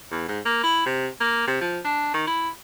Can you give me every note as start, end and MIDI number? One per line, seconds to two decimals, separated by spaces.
0.11 0.25 40
0.28 0.40 44
0.45 0.63 58
0.63 0.84 64
0.86 1.07 48
1.21 1.45 58
1.47 1.58 48
1.61 1.79 53
1.84 2.14 62
2.14 2.23 51
2.27 2.49 64